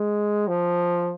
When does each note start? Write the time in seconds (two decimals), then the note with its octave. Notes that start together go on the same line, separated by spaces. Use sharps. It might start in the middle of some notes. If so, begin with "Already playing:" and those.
Already playing: G#3
0.48 F3